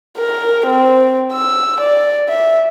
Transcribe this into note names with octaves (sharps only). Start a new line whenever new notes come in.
A#4
C4
E6
D5
E5